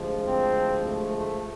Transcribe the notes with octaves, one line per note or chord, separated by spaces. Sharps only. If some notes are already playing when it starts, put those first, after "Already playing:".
Already playing: D2 C3 F3 G#3
C4
A3
A3